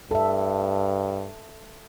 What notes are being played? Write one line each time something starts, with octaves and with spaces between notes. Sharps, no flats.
G2 A4 E5